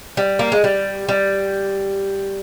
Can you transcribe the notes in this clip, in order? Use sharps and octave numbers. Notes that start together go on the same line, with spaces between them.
G3
A#3
G#3
G3
G3